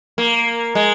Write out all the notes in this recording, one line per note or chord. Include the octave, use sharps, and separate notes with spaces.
A#3
G#3